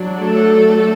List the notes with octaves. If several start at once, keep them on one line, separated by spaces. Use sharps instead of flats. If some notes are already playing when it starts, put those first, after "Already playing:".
Already playing: F#3 D4
A3 A4